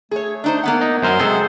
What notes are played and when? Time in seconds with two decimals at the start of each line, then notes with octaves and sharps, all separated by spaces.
0.11 A3 G#4 C#5
0.44 D4 D#4 C5
0.64 A#3 B3 F#5
0.81 D#4
1.02 F#2 A#4 C5 G#5
1.19 C3 F#3 G#3 G#4 A4